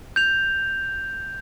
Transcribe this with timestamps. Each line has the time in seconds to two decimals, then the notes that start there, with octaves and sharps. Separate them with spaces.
0.16 G6 F7